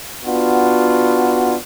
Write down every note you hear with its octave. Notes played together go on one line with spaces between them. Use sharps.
B3 D4 F4 F#4